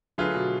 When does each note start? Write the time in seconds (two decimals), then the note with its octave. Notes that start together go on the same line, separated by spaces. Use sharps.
0.18 D3 F#3 A3 F4 G#4 B4
0.34 B2